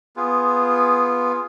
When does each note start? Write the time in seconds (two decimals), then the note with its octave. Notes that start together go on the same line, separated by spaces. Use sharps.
0.16 B3 F4 G#4